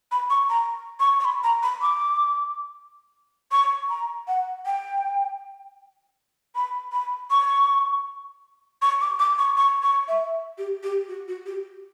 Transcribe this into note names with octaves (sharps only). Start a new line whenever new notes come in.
B5
C#6
A#5
C#6
C#6
B5
A#5
B5
D6
C#6
A#5
F#5
G5
B5
B5
C#6
C#6
D6
D6
C#6
C#6
C#6
E5
G4
G4
F#4
F#4
G4